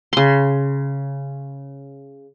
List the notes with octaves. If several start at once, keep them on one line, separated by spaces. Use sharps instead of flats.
C#3 C6